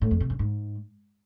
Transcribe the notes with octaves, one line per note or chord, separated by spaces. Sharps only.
A2
F2
C3
F#2
G#2